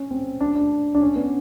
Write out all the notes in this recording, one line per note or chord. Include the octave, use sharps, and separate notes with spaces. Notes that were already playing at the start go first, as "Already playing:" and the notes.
Already playing: C#4
C4
D4
D4
D4
C#4
B3